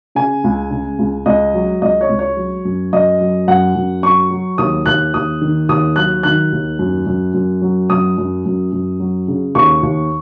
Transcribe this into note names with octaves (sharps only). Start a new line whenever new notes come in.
C#3 G#5
C#2
C#3
C#2
C#2 D#5
F#3
C#2 D#5
C#5
C#2
C#5
F#3
F#2
F#2 D#5
F#3
F#2 F#5
F#2
F#3 C#6
F#3
D#2 D#6
D#2 F#6
D#2 D#6
D#3
D#2 D#6
F#3 F#6
D#3 F#6
D#2
F#2
F#2
F#2
F#3
F#2 D#6
F#2
F#2
F#2
F#3
C#3
D#2 C#6
D#2